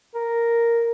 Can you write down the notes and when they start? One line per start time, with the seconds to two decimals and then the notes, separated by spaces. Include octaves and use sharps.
0.15 A#4